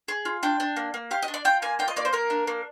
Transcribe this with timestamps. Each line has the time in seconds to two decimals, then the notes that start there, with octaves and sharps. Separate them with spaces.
0.08 G#4
0.25 F4
0.43 D4 G5
0.60 D4
0.76 A#3
0.94 A#3
1.11 G4 F5
1.23 D#5
1.28 D4
1.34 D5
1.45 F4 G5
1.62 A#3 G#5
1.79 F4 G5
1.88 D#5
1.96 A#3 D5
2.05 C5
2.13 A#3 A#4
2.30 D4
2.47 A#3